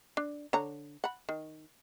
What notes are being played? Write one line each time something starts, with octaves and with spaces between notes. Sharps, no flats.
D4
D3 C#5 A#5
F#5 B5
D#3